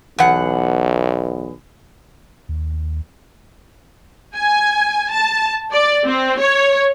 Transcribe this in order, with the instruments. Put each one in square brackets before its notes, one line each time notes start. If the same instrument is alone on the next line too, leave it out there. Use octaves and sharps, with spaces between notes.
[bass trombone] B1 [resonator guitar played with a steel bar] E2 F#5
[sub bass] D#2
[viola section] G#5
A5
D5
C4
C#5